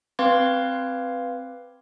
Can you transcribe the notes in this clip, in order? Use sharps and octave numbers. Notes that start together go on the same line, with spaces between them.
C4 B4 F5 C6 D6 G#6